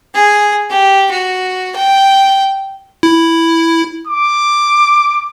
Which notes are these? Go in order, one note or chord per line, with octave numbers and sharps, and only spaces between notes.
G#4
G4
F#4
G5
E4
D6